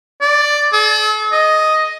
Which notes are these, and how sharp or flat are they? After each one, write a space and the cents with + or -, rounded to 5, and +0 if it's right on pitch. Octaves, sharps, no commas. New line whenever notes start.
D5 +5
A4 -45
D#5 +5